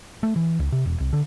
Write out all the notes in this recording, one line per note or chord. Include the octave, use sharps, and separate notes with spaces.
A3
E3
C#2
C3
E1
C2
D3